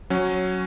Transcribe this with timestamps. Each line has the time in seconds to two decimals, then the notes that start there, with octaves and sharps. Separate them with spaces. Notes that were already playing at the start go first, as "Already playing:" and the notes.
0.10 F#3 C#4